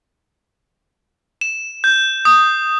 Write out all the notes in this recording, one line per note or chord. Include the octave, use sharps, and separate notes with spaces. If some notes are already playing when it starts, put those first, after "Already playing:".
E7
G6
D#6